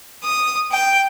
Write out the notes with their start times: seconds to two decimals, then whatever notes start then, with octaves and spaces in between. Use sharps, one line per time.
0.24 D#6
0.71 G5